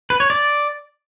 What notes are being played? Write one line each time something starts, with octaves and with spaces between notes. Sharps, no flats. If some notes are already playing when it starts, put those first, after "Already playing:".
B4
C#5
D5